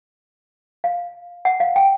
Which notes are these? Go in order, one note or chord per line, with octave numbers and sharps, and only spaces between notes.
F5
F#5
F5
G5